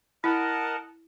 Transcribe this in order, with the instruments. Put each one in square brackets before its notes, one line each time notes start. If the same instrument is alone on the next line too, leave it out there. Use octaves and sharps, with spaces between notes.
[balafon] E4 [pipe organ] A#4 D#5 F#5 [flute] A5